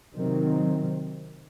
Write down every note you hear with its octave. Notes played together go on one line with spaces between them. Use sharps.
C3 D#3 F#3 C4